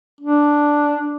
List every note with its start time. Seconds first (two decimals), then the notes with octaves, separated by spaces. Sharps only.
0.21 D4